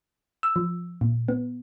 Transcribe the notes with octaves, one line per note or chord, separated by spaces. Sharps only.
E6
F3
A#2
B3